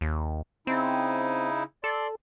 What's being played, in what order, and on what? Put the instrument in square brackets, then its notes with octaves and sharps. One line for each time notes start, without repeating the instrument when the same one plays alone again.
[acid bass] D#2
[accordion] C#3 D#4 E4 [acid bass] C4
[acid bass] A4 [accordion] D5 C6